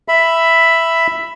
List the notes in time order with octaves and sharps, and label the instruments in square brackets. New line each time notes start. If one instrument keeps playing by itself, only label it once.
[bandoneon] E5 B5